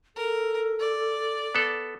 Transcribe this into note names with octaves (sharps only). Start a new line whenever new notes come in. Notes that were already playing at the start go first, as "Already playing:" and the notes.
A4 A#4
D5
B3 A4